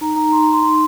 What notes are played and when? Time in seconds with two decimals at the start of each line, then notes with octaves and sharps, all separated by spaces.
0.01 D#4 A#5
0.16 D#4 A#5
0.32 D#4 C6
0.43 A#5
0.49 D#4 C6
0.63 D#4